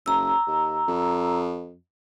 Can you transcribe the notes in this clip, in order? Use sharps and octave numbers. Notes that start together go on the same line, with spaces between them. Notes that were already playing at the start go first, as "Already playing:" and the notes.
F#1 A#5 E6
D#2
F2